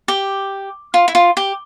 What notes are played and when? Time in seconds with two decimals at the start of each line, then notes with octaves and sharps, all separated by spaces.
0.08 G4
0.94 F4
1.08 E4
1.15 F4
1.37 G4